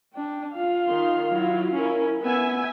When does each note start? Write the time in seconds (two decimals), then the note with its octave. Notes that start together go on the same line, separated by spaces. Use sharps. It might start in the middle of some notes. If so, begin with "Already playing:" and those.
0.14 D4 G5
0.52 F4 F5
0.88 D#3 C6
1.31 F#3 E4
1.73 C#4 E4 A#4
2.22 B3 E5 G#5